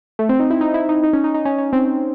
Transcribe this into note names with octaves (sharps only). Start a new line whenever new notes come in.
A3
C4
D#4
E4
D#4
E4
D#4
D#4
C#4
D#4
D#4
C#4
C#4
C4